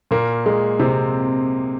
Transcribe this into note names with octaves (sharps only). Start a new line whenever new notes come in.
A#2 A#3
G#3
C3 C4